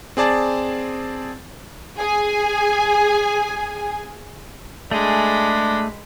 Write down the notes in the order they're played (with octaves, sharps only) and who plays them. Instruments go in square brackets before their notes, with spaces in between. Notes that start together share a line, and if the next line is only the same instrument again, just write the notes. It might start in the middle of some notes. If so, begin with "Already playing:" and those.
[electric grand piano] C4 G#4 D5 A5 A6
[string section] G#4 G#5
[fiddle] G#3 B5 [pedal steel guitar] A3 G#4 [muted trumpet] D4